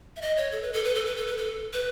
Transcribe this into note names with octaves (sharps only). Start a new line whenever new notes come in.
E5
D#5
C#5
A4
B4
A4
B4
A4
B4
A4
B4
A4
B4